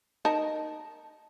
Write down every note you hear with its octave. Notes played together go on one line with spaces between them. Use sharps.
D#4 A#4 A5